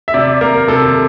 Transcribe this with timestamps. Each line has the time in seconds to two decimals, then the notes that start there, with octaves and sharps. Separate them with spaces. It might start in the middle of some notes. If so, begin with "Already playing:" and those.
0.08 E5
0.14 C3 D5
0.41 A#3 A#4
0.68 C3 A4